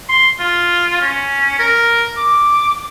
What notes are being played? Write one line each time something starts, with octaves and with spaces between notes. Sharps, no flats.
C6
F4
C#4
A#4
D6